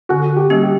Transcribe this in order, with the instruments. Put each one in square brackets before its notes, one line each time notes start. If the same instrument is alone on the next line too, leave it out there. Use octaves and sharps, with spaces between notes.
[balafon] D3 [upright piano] F#4
[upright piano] G4
[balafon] G3 A#3 C#4
[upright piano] G4